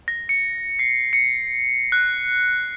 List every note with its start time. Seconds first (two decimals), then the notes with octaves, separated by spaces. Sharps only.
0.08 A#6
0.29 C#7
0.79 C7
1.13 C#7
1.92 F#6